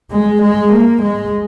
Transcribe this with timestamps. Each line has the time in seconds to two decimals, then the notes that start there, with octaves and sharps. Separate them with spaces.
0.11 G#3
0.43 G#3
0.73 A#3
1.03 G#3